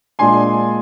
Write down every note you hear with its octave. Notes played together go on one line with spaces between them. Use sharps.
A#2 G#3 D4 G#5 C6